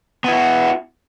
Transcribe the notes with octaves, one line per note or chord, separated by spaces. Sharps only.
B3 E4 F#4